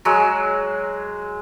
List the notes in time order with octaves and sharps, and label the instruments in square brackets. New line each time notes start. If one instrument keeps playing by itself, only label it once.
[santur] F#3 G#3